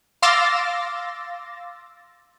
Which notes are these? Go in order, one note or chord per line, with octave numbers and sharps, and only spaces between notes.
F5 C6 D6 E6 A6 A#6